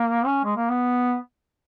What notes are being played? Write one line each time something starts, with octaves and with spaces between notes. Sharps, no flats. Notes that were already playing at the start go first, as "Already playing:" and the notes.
Already playing: A#3
C#4
G#3
A#3
B3